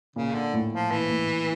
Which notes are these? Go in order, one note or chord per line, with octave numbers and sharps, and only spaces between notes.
A#2 C#3
D3
A2
F3
A#2 E3
A2